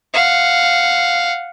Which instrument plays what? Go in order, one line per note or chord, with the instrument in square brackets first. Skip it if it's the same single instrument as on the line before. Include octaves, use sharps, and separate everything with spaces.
[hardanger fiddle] F5 F#5